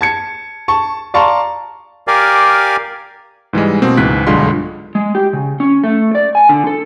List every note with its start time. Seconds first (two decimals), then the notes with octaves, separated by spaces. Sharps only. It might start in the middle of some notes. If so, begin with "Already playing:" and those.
0.01 A5 G#6 C#7
0.68 A5 C#6
1.14 D5 F5 A5 A#5 C6 C#6
2.08 G4 A#4 D5 F5 G#5
3.53 G#2 E3 G3 G#3
3.82 B2 A3 A#3 C4
3.97 C#2 G#2 E3 F#6 B6
4.27 B1 G2 D3 G#3 F4 C6
4.95 G#3
5.15 G4
5.33 C#3
5.60 C#4
5.84 A3
6.15 D5
6.35 G#5
6.49 D3
6.67 A4